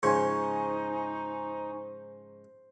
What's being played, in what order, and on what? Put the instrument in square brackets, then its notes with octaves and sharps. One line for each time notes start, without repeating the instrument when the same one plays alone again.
[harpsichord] G#2 C#3 F3 [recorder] D#4 [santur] C5 [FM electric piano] G#5 C#6